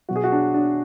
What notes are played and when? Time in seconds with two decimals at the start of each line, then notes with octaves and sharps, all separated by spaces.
0.09 B2 F#3 F#4
0.16 G#4
0.24 F#4
0.32 D4
0.54 D4